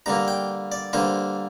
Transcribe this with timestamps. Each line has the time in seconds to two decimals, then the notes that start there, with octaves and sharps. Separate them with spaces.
0.06 G2 D3 A#3 A#5
0.28 G5
0.72 D5
0.93 G2 D3 A#3 C5